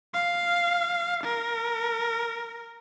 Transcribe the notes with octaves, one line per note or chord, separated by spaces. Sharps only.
F5
A#4